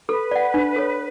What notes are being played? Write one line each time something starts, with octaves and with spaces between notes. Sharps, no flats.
A4 B4
D5 F#5
D4
A4 C#5